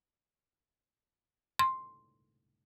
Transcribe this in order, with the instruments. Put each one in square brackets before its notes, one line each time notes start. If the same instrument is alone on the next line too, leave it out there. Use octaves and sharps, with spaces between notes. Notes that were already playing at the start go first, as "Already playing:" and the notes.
[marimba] C6